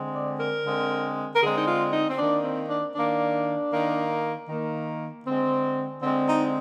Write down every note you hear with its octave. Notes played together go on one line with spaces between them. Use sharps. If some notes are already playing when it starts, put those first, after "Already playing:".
Already playing: D3 G#3 C4
D5
A#4
D3 G#3 C4
A#4
D3 G#3 C4 G#4
D#4
F4
D#4
C4
D#3 A#3 D4
C4
D4
D#3 A#3 D4
D#3 A#3
D#3 A#3
D3 G#3 C4
D3 G#3 C4
D#4